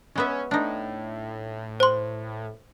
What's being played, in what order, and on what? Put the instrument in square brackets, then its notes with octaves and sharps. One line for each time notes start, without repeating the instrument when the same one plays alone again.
[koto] G#3 B3 E5 [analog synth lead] C#4
[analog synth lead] A2 [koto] D4 D#4
[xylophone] C5 C6